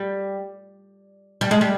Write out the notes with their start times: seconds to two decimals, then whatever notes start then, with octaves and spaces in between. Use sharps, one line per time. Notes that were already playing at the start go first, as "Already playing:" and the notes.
Already playing: G3
1.41 G3
1.51 G#3
1.61 G3